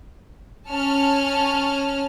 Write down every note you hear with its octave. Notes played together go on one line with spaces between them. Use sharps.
C#4 A5 F6